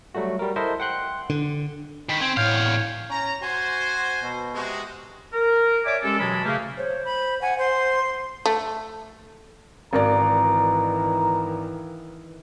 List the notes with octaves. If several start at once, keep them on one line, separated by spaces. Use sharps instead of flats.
F#3 G3 A3 F#4
G3 A#4
E4 A4 A#4 C5 D#5 E5
F#5 G5 C6 F#6
D3
D#3 B5
C4 G#5
E2 A2 C#5 F5 F6 G6
C#4 A#5
F#4 C5 G#5
B2
C3 G#3 F#4
A#4
C#5 D5 E5 G#5 D6
G#3 C#4 G4 A4
B2 E3 F#3 G#3 A5 B5
C#3 A3 A#3
C5 C#5
B5
F#5 G#5
C5 C6
A3
G#1 D#3 E3 A#4 D5 A#5